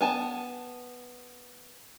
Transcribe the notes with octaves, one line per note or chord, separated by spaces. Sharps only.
B3 G#5 A5